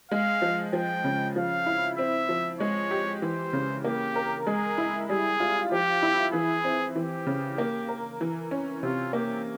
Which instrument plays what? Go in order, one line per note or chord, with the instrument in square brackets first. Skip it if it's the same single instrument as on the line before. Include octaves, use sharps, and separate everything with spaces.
[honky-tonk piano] G#3 [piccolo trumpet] F5
[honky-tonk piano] F3
[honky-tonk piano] F3 [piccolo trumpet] G5
[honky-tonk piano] C#3
[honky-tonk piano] F3 [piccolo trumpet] F5
[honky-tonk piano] E4
[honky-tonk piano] C4 [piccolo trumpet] E5
[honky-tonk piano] F3
[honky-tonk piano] G#3 [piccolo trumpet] C#5
[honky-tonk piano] G4
[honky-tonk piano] E3 [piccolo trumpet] C5
[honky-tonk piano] C#3
[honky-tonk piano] A#3 [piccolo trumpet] G4
[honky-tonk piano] A#4
[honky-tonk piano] G#3 [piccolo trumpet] G#4
[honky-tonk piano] E4
[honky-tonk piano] G3 [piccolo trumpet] G#4
[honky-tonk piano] F4
[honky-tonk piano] F3 [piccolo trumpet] G4
[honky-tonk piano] E4
[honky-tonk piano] E3 [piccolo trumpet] G#4
[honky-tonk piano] C4
[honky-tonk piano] E3 [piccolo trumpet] G4
[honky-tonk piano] C#3
A#3
A#4
E3
C#4
[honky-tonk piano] C3 [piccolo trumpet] F4
[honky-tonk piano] A#3 [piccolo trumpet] G4